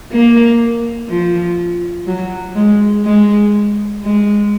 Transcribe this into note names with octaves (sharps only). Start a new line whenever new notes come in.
A#3
F3
F#3
G#3
G#3
G#3